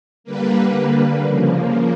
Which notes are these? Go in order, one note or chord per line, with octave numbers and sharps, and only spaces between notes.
D3 G3 A#3 B4
C#3 F3 A#3